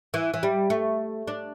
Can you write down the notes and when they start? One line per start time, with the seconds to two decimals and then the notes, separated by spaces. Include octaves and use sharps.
0.14 E3
0.34 E3
0.43 G3
0.70 A3
1.27 D4